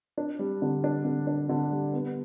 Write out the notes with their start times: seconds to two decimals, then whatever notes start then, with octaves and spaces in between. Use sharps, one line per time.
0.18 D4
0.39 G3
0.62 D3
0.84 D4
1.05 D3
1.27 D4
1.49 D3
1.71 G3
1.93 B3